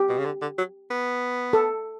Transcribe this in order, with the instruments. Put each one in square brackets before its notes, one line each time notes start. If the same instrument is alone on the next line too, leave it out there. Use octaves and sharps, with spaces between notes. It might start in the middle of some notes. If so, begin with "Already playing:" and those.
Already playing: [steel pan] G4
[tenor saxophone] B2
C#3
D3
D3
F#3
B3
[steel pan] A4